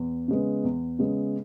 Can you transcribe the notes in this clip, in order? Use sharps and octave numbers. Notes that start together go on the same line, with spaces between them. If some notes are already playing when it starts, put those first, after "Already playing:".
Already playing: E2
C#3 G#3 B3
E2
C#3 G#3 B3